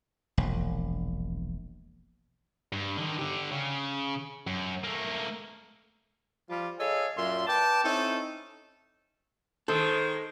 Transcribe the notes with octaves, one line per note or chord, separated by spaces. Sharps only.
E1 A#1
G2
D3 D#3
D3 G4
C#3
F#2
A3 A#3
F3 G3 F4
G#4 A4 C#5 D#5 F5
F#2 A#2 F4 E5 C6
B4 D5 G5 A5
C4 C#4 D#4 E4 A4
D#3 G#3 A4 C5